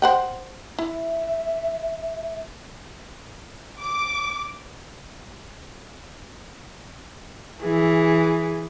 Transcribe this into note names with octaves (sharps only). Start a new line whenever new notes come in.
C5 F#5 G5
E4 E5
D6
E3 G#4